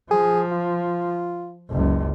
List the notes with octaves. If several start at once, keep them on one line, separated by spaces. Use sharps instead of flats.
F3 G#4
F4
F#1 C#2